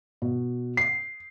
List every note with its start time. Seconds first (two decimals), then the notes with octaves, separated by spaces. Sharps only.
0.22 B2
0.77 C7